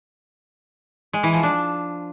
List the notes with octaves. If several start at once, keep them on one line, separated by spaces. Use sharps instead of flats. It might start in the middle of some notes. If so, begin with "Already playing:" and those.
G#3
E3
F3
D4